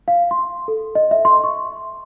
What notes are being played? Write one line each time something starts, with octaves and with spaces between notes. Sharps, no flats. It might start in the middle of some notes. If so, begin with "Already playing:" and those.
F5
C6
A4
D#5
E5
C6
C#6